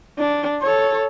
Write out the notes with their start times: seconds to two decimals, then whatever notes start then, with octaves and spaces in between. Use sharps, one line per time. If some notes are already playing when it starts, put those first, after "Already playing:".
0.18 D4
0.62 A4 C#5